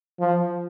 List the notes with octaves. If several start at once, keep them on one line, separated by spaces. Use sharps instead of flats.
F3